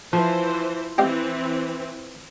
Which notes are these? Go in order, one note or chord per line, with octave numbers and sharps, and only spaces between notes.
E3 F3 C5
E3 C4 G4 D#5 F5